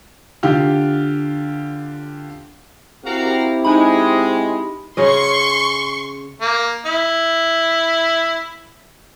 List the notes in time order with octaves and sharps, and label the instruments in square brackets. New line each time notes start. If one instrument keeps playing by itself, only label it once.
[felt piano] D3 F4 G4 F6
[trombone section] C4 E4 G4 [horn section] F#4 A#4 F5
[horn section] G#3 [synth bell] D#4 B5
[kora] C#3 C#4 D#5 [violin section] C6 C#6
[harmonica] A#3
E4